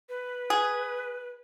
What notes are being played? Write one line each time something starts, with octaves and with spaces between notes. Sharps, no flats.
B4
G#4